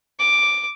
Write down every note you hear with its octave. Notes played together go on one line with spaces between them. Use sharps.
D6